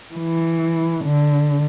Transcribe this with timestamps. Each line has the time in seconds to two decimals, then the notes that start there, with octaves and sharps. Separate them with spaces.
0.14 E3
1.04 D3